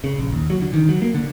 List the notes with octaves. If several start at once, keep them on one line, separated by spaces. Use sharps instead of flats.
C#3
A#1
D#2
F#3
D3
D#3
F#3
A#3
D3